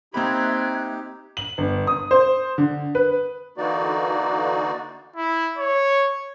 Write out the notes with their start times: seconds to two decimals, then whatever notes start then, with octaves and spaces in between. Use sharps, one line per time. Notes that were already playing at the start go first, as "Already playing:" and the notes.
0.14 A#3 C4 D#4 G4 E5 B5 F#6 G#6
1.37 F#7
1.58 G1
1.87 D#6
2.11 C5
2.58 D3
2.95 B4
3.57 D3 E3 A#3 D#4 F#4 D5
5.16 E4
5.58 C#5